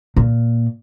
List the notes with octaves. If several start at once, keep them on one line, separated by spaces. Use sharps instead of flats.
A#2